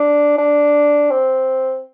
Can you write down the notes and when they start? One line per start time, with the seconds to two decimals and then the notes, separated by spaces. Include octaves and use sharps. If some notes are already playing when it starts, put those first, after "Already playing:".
Already playing: D4
0.38 D4
1.11 C4